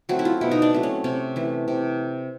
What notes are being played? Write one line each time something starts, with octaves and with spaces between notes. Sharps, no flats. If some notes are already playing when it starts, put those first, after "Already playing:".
F#3 A3 C4 F#4
E4
F4
B2 E4
D#4
D4
F#3 A3 C4
C#4
C3 C#4
E3 A3
C3